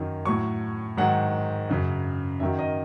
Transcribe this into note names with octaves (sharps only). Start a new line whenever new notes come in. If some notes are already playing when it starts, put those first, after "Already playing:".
Already playing: F#2 D#3 F#3
A2 F#3 C#6
G#2 D#3 F#3 F#5
F#2 C#3 F#3
F#2 D#3 F#3 E5
D#5